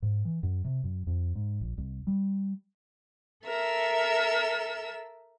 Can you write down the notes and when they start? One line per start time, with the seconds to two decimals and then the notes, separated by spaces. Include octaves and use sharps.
0.02 G#2
0.25 E3
0.43 F#2
0.64 C3
0.84 F#2
1.07 F2
1.35 G#2
1.61 A#1
1.77 C2
2.07 G3
3.45 A4 A#4 E5 E6